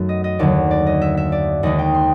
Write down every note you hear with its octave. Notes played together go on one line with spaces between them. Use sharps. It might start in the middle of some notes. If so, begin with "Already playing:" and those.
Already playing: F#2 D#3 F#3 A3
D#5
D#5
D#2 D3 F#3 D5
D5
D#5
E5
E5
D5
D#2 D#3 G#3 D#5
G5
C6